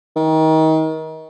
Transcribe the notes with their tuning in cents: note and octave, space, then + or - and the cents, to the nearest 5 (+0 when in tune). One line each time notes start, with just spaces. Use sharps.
D#3 +30